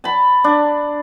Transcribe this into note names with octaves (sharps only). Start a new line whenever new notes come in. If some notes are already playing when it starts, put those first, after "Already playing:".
A5 B5
D4